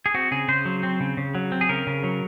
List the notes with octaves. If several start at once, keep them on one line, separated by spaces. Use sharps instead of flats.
G#4
C4 F#4
C#3 G#4
C#3 C5
F#3
C4
C#3
C#3
F#3
C4
G#4
C#3 A#4
C#3
F#3